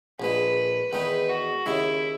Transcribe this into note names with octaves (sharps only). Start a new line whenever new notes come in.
A#1 A#2 G#3 B4
E2 D#3 G#3 D#4 B4
F#4
D#2 C#3 G#3 E4